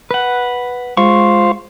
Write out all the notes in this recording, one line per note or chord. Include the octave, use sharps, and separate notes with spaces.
B4 F#5
G#3 F4 C5 F5 C#6